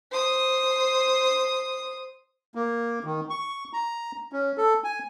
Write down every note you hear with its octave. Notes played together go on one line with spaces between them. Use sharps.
C5 D#6
A#3
D#3
C#6
A#5
C#4
A4
G#5